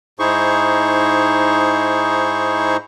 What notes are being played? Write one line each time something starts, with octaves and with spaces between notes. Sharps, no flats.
G#2 D#4 E4 G#4 C5 C#6